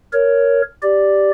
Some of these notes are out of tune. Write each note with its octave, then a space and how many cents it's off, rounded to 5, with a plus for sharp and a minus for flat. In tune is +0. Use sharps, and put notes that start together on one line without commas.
A#4 +0 C#5 +10
G4 +0 D5 +0